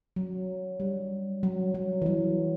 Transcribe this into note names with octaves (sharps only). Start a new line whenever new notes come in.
F#3
G3
F#3
F#3
E3
F#3